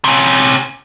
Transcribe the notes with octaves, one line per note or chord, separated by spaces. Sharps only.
C3 C#4